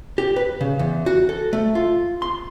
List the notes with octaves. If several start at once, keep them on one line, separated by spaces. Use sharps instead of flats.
G4
B4
C#3
E2
F#4
A4
A3
F4
C6